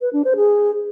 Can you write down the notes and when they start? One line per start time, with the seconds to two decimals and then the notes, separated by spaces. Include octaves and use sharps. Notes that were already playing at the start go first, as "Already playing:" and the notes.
0.01 B4
0.13 D4
0.25 C5
0.36 G#4